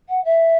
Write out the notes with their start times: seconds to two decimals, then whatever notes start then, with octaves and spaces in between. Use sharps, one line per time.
0.09 F#5
0.25 E5